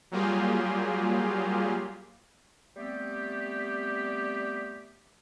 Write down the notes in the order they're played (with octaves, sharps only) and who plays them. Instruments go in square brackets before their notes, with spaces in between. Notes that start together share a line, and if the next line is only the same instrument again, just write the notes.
[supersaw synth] F#3 G3 A#3 F4 G4 G#4
[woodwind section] G3 A3 B3 C4 G4